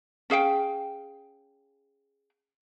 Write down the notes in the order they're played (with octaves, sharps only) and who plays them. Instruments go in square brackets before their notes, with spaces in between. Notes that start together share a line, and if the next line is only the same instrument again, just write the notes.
[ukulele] C#4 G#4 F5 G5